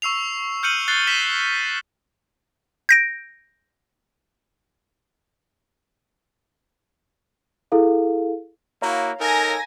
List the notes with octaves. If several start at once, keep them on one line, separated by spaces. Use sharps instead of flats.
C#6 E6 C7 F7
F6 G6 C#7 D#7 F#7
F#6 A6 C7 G7
B6 D#7 E7 G7
G6 A#6 D7
E4 G#4 A4 F5
A#3 E4 F#4 C#5 F5 A#5
D#4 A4 A#4 G#5 A#6